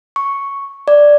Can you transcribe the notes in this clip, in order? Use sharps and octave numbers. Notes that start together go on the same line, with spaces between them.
C#6
D5